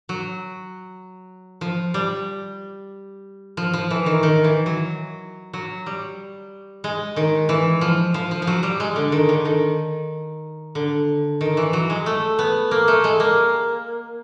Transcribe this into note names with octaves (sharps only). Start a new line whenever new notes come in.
F#3
F3
G3
F3
F3
E3
D#3
D#3
E3
F#3
F#3
G3
G#3
D#3
E3
F3
F3
F3
F3
F#3
G3
G#3
D3
D#3
D3
D#3
D3
D#3
E3
F#3
G#3
A3
B3
A#3
A3
G#3
A#3